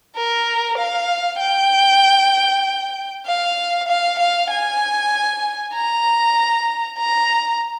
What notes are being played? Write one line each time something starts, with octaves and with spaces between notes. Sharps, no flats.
A#4
F5
G5
F5
F5
F5
G#5
A#5
A#5